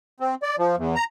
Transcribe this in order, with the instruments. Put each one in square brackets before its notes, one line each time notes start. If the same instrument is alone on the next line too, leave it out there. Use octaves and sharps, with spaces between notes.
[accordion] C4
D5
F3
E2
A#5